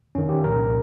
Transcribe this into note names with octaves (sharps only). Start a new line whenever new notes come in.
F2 D#3 C#4
G4
C2 A#2 F3 A#4